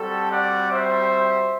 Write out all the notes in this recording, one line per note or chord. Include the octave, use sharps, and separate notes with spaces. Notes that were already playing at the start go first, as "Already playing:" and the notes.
Already playing: G3 C4 F#4 A4
D5 F#5
C5 E5